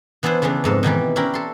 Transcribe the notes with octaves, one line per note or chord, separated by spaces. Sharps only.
E3 B3 D4 E4 C5
C#3 E3 A3 B3 D4
F2 G#2 A4
B2 D#3 E3 G4
C#4 D4 E4 A#4 G5 B5
A4 C6